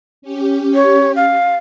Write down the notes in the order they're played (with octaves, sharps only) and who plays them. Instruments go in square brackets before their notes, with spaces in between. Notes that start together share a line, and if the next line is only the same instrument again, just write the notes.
[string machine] C#4 G4
[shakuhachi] C#5
F5